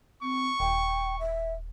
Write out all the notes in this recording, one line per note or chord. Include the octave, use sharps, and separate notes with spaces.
C4 C#6
D#1 G5
E5